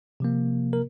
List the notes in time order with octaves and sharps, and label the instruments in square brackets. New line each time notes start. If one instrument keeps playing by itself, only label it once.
[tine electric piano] C3 F3 A#3
A#4